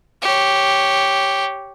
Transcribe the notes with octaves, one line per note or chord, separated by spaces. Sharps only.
G4 C#5